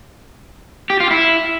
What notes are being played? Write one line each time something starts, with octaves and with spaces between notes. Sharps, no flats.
G4
F4
E4